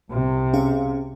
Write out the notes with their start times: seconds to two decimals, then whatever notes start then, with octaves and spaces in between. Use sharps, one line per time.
0.11 C2 C3
0.54 C#4 G#4 F5